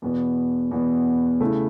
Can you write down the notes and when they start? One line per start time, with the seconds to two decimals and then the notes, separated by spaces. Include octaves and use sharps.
0.02 E2 B2 B3
0.71 E2 B2 B3
1.40 C#3 A3 E4